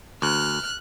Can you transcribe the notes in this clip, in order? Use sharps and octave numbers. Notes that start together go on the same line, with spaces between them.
D2 F6 F#6